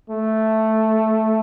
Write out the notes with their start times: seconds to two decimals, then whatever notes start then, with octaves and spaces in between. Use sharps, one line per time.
0.10 A3